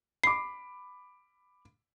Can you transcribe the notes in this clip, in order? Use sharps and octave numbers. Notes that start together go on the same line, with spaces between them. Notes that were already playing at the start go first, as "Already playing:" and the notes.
B5 D6 C7